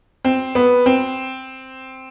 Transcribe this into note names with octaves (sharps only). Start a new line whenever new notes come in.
C4
B3
C4